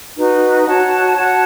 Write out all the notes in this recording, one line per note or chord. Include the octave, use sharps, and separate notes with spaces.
D#4 F#4 B4
F#4 C#5 F#5 A5
F#4 C#5 F#5 A5